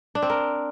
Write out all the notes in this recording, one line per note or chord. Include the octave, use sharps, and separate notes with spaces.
D4
C4
A#4